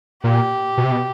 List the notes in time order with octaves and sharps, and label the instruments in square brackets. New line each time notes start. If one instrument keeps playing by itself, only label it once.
[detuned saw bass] A#2 [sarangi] G4
[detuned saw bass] B2
C3
B2